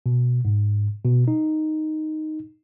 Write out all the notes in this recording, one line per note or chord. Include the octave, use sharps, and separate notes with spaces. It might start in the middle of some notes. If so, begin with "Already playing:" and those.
B2
G#2
B2
D#4